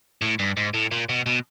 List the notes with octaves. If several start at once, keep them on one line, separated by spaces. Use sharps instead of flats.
A2
G2
G#2
A2
A#2
B2
B2